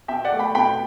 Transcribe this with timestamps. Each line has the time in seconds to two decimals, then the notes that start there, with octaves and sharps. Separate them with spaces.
0.08 B2 E5 G5
0.25 D5 F#5
0.33 A3
0.39 G5 B5
0.55 B2 G5 B5